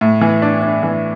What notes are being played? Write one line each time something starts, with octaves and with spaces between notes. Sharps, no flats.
A2
E3
D4
D4
E3